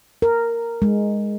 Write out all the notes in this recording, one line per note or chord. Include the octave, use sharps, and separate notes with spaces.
A#4
G#3